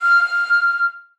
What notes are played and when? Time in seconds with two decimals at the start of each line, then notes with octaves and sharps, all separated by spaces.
0.01 F6